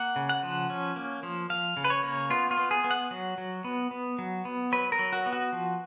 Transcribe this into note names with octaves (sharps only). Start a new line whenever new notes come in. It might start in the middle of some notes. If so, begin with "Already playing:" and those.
Already playing: A#3 F#5
C#3
F#5
F3
C#4
A#3
F3
F3 F5
C#3
B4
C#5
A#3
B3 F4
F4
B3
G#4
B3
F#5
F#3
F#3
B3
B3
F#3
B3
F#3 B4
A#4
F#3
F#4
B3
F#4
F3